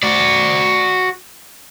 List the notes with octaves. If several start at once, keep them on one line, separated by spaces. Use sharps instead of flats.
F#4 D5